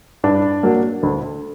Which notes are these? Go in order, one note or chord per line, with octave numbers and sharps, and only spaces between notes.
G2 D4
F#3 A#3
D2